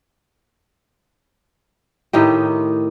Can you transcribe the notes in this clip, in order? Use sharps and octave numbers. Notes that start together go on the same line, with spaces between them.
A2 D#3 D#4 G4